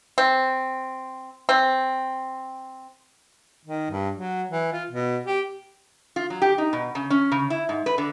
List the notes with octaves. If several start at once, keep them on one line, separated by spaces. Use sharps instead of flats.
C4
C4
D#3
G2
F#3
E3
F4
B2
G4
F4
F#3
G4
D#4
B2
C#3
C#4
C#3
E4
G#2
B4
D3